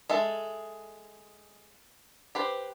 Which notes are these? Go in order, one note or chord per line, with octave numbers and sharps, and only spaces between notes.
G#3 A4 E5 A5
G4 B4 C5